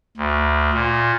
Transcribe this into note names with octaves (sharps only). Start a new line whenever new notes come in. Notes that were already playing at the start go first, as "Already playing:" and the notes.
D2
A#2